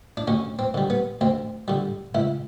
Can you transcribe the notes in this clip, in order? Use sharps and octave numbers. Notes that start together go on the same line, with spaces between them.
D4
D2 C#4
C4
D3 G3
B3
D2 C4
D3 G3
C#2 E4